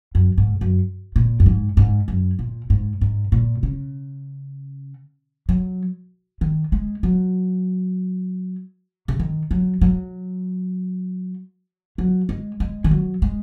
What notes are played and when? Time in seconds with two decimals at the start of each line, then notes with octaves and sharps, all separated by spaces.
0.15 F#2
0.38 G#2
0.61 F#2
1.16 A#2
1.40 F#2
1.46 G#2
1.77 G#2
2.08 F#2
2.39 A#2
2.70 G#2
3.01 G#2
3.32 A#2
3.63 C#3
5.49 F#3
6.41 D#3
6.72 G#3
7.03 F#3
9.08 C#3
9.20 D#3
9.51 F#3
9.81 F#3
11.98 F#3
12.29 G#3
12.60 G#3
12.84 D#3
12.91 F#3
13.22 G#3